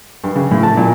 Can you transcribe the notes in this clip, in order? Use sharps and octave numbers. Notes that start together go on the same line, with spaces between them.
G2
C#3
A2
A5
A#2